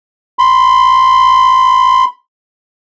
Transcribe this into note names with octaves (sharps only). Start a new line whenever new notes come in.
B5 C6